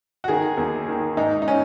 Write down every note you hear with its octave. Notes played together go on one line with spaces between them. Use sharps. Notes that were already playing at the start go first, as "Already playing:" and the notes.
F#4
D#3 G#4
D#2
D#3
G#2 D#4
D#4
C#4